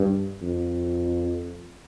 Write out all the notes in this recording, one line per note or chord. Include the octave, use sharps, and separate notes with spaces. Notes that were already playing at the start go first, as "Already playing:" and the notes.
Already playing: G2
F2